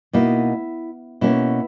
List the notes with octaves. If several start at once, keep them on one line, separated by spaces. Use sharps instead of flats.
B2 A#3 D#4 E4
B2 A#3 C#4 E4